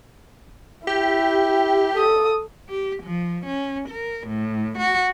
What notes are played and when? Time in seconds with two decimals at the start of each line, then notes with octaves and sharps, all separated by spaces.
0.87 E4 G4
1.95 A4 D#6
2.70 G4
3.03 F3
3.47 C#4
3.89 A#4
4.28 A2
4.78 F#4